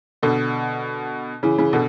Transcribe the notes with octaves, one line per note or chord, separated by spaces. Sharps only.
B2 D3
C#3 E3
C#3 E3
B2 D3